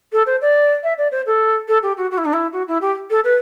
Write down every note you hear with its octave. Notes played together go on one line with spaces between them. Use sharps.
A4
C5
D5
E5
D5
C5
A4
A4
G4
F#4
F#4
E4
D4
E4
F#4
E4
G4
A4
B4